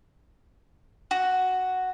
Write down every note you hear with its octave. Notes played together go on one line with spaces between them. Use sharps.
F#4